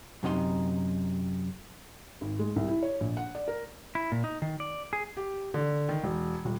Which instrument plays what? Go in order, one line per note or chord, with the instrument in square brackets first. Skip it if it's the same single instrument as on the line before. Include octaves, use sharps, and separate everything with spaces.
[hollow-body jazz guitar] F#2 C3 D#4 F#4 C6
[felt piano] G#1
G#3
C2
E4
C#5
A#1
F#5
D5
A#4
[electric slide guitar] E4
A#2
D#4
D#3
D5
G#4
[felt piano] G4
D3
D#3
E1
D#1